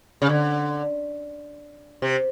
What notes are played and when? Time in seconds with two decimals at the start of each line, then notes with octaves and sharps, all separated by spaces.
0.22 C#3
0.29 D3
2.02 C3